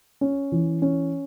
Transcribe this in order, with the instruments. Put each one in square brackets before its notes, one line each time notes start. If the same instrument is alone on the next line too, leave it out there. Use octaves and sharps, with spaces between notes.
[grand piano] C#4
E3
C#4